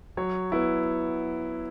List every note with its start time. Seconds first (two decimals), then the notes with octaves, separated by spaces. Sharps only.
0.17 F#3 C#5
0.52 B3 E4